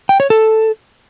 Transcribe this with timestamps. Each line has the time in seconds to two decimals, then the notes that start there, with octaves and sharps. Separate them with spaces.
0.09 G5
0.20 C#5
0.30 A4